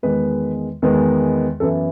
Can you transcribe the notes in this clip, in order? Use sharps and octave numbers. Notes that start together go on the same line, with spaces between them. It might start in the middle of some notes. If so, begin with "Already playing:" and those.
E2 D#3 G#3 B3 B4
E2 D#3 G#3 B3
F#2 E3 B3 A4